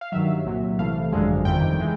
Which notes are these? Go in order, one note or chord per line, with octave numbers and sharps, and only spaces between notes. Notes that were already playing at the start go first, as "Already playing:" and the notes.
F5
G2 D#3 F#3 E5
C2 A#2 F#3
C2 C3 E3 A3 F5
G#1 F#2 D3 F3 G#3
G1 F2 C3 D#3 G3 G5
E3 G#3